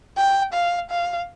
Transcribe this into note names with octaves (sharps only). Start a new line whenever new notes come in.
G5
F5
F5